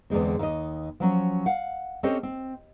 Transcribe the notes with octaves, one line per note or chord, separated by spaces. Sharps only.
E2 D3 G#3 C4
D#2 D#5
F3 F#3 C#4
F5 F#5
C4 C#4 G4 A4 C5 D#5
C4